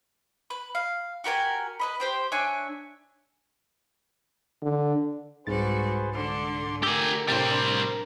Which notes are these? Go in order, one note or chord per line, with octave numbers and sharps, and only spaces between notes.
B4
F5
F#4 G4 A#4 G#5
B4 D#5 B5
G4 C5 G5
D4 C#5 E5 G#5
D3
C2 G#2 G3 F#4 G#4 B4 C5 A6
D3 D4 C6
D3 A3 G4 A#4 G#5 E6 A#6
A2 C3 G3 C4 D4 C5